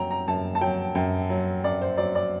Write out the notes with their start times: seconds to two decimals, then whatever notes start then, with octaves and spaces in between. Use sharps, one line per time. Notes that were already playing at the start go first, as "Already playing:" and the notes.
Already playing: F#2 F#3 G5 A#5
0.11 A#5
0.28 F#2 A5
0.55 A5
0.61 F#3 G5
0.95 F#2 G5
1.30 F#3
1.64 F#2 D5
1.81 C5
1.98 F#3 D5
2.15 D5